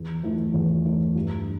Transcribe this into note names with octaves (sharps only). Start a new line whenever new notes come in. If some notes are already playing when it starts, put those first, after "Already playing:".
Already playing: E2
E3 A3 E4
E2
E3 A3 E4
G2